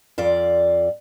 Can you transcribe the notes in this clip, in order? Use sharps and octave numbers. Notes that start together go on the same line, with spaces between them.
F2 F4 D5